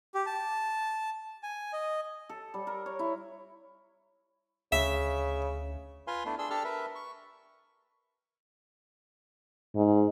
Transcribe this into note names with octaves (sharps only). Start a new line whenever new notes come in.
G4
A5
G#5
D#5
A4
G3
A#4
C#5
E4
D2 C#3 E5
F4 B4 F5 G#5 C6
A3 B3 D4 E4
D4 G#4 C6 E6
D4 G4 A4 A5 E6 F6
A#4 B4 E5
C#6
G#2